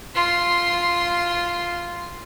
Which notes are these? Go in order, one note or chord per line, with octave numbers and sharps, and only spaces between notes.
F4 C6